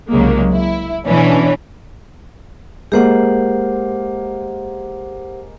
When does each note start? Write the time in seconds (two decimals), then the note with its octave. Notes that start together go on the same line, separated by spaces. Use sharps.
0.10 C2 C#3 F#3 G#3 A#3
0.52 E4
1.08 B2 E3 C#4 D4
2.92 G#3 A#3 G4 C5 F#5